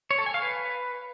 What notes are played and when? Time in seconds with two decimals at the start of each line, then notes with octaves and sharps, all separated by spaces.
0.11 C#5
0.18 A4
0.26 G#5
0.34 F5
0.42 B4